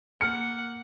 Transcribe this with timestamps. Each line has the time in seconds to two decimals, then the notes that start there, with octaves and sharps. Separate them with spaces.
0.21 A#3 F#5 F6 C#7